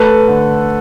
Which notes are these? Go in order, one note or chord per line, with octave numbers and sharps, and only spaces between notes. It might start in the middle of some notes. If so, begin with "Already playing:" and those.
Already playing: A3 A4 B4
D3